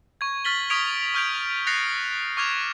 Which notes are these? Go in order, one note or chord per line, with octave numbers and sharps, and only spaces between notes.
C#6 G#6
C#6 F6 A6 B6 F#7 G7
C#6 D#6 G#6 B6 D7 F7
C#6 F6 G6 G#6 D7
F#6 A6 A#6 C7 C#7 F7
C#6 D6 F6 G#6 F7